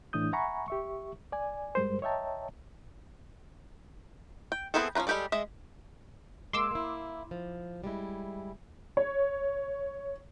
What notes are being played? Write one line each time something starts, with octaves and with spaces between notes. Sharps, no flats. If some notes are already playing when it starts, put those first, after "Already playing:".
A2 E3 D4 E4 D#6 G6
E5 F#5 G#5 A#5 B5 C#6
G4 E5 C#6
D5 G#5
G2 G3 G#3 A#4 C5
C#5 D#5 E5 G5 A5 A#5
G5
B3 C4 E4 G#4 A4
F3 C#4 F4 B4 A#5
G3 G#3 G4 A4 D5
G#3 D#5 E5
G#3 A#3 G#4 C6 D6 E6
A#3 E4
F3
G3 G#3 E4
C#5